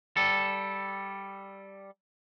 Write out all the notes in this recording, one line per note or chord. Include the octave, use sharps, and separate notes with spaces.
G3 A4